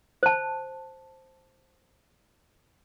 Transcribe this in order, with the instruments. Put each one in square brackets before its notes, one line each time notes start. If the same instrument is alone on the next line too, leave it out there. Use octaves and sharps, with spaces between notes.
[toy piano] C5 A5